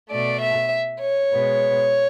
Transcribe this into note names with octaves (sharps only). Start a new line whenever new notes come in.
B2 A3 D5
E5
C#5
B2 G#3 B3